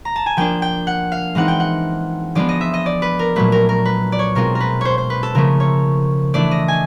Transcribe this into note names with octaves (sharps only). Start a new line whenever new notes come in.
A#5
A5
G#5
F3 A#3 D4 G5
G5
F#5
F5
E3 G#3 C4 D#4 F#5
G5
F#5
F3 G#3 B3 D4 F4 D5
D#5
E5
D#5
D5
B4
A#4
A#2 F#3 A3 B4
A#4
A#4
B4
D5
C#5
B2 G#3 C4 F4 A#4
A#4
B4
C5 C#5
C5
B4
A4
C#3 F3 A3 C#4 A#4
C#5
E3 A3 D4 D5
D#5
G#5